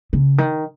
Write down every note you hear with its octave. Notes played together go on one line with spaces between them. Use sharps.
C#3
D#3